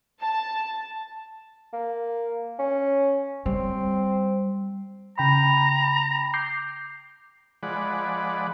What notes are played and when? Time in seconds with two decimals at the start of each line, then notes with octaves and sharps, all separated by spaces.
0.21 A5
1.73 A#3
2.59 C#4
3.46 G3 C4
5.18 C#3 G5 A#5 B5
6.34 D6 G6 C7
7.63 F3 G#3 D5 F#5 B5